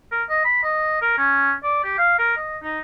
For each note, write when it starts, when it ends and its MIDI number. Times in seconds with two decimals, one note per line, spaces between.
0.12 0.23 70
0.29 0.42 75
0.45 0.63 83
0.63 0.99 75
1.02 1.18 70
1.18 1.53 61
1.63 1.81 74
1.84 1.95 67
1.98 2.14 77
2.18 2.36 70
2.37 2.57 75
2.63 2.79 63